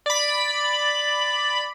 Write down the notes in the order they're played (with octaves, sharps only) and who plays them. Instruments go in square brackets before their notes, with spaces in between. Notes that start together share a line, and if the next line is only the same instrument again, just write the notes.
[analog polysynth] D5 B5